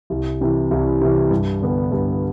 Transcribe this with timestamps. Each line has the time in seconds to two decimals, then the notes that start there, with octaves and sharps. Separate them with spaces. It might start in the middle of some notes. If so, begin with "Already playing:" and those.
0.10 C2
0.41 C3 E3
0.71 C2
1.01 C3 E3
1.31 G2
1.61 D3 G3 B3
1.92 G2